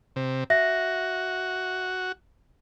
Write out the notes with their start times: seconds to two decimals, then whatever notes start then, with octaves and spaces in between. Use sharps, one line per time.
0.16 C3
0.50 F#4 E5 A#6